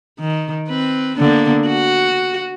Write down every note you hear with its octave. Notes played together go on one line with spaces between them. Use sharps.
D#3
C4 B4
D3 A#3 B3
F#4